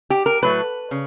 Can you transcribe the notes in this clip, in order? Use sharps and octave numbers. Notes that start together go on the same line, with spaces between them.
G4
A#4
A2 F#3 A3 B4
C#3